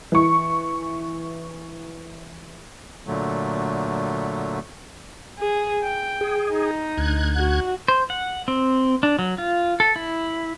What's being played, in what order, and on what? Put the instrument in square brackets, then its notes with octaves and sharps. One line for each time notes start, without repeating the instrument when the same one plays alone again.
[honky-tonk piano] E3 C#6
[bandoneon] A#2 D3 F#3 A3
[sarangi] G#4
G5
[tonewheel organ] G#4
[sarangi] D#4
[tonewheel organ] D2 F#6 G#6
[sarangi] F#4
[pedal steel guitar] C5
F#5
C4
D4
F#3
F4
A4
E4